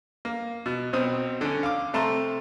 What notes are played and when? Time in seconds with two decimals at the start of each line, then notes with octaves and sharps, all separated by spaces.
0.25 A#3
0.66 B2
0.93 B1 B2 C4 D#6
1.41 D3 C#4
1.63 F5 D6
1.94 C3 A3 A5 A#5 C6